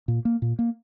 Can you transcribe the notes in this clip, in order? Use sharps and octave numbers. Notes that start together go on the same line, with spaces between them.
A#2
A#3
A#2
A#3